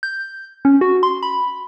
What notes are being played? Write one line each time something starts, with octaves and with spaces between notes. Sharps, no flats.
G6
C#4
F#4
C6
B5